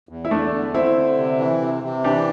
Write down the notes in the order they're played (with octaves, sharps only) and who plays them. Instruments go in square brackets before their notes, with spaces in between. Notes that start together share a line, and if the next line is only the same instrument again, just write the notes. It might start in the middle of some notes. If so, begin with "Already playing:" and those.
[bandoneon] E2
[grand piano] E4
[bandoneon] E2 [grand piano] A3 D4
[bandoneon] D3
[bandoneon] D3 [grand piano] C4 E4
[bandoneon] D3
C3
E3
C3
C3
[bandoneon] E3 [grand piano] D4 G4